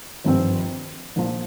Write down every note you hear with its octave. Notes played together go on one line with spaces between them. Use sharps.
G#1 G2 F3 C4
A#1 A#2 F3